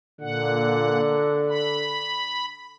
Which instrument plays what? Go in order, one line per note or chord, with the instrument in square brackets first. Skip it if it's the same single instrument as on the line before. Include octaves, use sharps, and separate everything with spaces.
[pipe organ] A#2 F#5 [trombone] D3
[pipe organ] B5